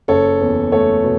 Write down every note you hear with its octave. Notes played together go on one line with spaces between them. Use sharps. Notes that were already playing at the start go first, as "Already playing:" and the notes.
F#1 A4 C#5
E2
A3 A4 C#5
B2